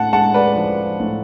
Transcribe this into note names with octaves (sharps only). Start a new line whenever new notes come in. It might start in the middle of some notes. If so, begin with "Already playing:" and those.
Already playing: A2 F#5 A5
G#3 F#5 A5
B4 D5
F3
A2